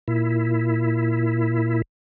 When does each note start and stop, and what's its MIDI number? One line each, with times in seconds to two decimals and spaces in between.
0.08 1.82 46
0.08 1.82 64